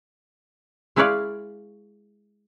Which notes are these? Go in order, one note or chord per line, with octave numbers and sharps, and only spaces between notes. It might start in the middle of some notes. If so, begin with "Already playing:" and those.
G#3 E4 B4 C#5 D5 F5